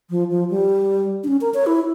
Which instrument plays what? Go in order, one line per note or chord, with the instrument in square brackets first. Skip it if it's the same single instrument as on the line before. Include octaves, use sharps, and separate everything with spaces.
[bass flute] F3
F3
G3
D4
C#4
A#4
C#5
E4